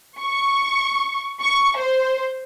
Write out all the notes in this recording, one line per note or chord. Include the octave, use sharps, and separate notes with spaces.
C#6
C#6
C5